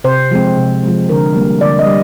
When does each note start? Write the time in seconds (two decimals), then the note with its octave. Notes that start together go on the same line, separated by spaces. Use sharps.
0.04 C3 C5
0.31 F3 G#3 C4
0.58 C3
0.83 F3 G#3 C4
1.09 D3 A#4
1.35 G3 A#3
1.61 D3 D5
1.79 D#5
1.87 G3